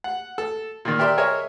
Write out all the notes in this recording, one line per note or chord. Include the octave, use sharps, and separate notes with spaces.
F#5
A4
A#2 D#3
G4 A#4 D5 E5 C6
G#4 A#4 C#5 D#5 E5